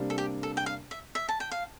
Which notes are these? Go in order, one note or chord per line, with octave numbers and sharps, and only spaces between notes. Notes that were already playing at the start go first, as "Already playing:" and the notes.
Already playing: C3 G3 A#3 D4
A4
G4
A4
G5
F5
E5
E5
A5
G5
F5